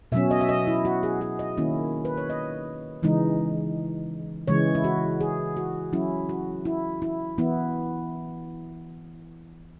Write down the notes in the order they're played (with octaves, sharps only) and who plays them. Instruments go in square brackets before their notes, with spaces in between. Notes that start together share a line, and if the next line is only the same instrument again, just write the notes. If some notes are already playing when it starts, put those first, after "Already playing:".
[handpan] B2 F#3 C#4 E5
D#5
E5
D#5
E4
F#4
G#4
F#4
D#5
D#3 A#3 C#4 E4
B4
C#5
D#5
C#3 E3 G#3 D#4
C#3 E3 G#3 C#5
E4
F#4
G#4
F#4
F#3 C#4 E4
F#4
E4
E4
E3 B3 E4